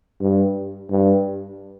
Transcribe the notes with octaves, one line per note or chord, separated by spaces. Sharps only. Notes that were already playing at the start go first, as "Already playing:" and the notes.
G2
G2